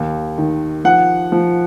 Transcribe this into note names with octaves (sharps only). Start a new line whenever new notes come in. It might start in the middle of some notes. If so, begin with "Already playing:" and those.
Already playing: D#2
D#3
F3 F#5
F3